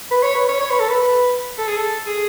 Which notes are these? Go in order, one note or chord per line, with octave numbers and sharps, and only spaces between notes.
B4
C#5
B4
C#5
C#5
B4
A4
B4
A4
G#4
A4
G#4